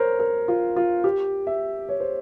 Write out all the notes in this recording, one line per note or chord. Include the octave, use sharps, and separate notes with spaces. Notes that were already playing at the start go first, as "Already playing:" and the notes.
Already playing: A#4 C5 C#5
A#4
F4
F4
G4
E5
C#5
C5